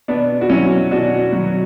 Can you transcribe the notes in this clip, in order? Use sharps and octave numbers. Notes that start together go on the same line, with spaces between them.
B2 B3 D4
F#4
F#3 C#4 E4
B2 D4 F#4
F#3